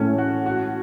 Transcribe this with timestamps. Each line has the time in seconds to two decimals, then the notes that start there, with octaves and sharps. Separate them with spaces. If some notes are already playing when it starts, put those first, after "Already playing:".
Already playing: A2 E3 A3 C#4
0.18 F#4
0.46 F#4